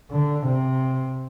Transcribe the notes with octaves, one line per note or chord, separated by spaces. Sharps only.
D3
C3